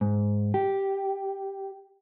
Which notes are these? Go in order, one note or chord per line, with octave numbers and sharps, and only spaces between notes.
G#2
G4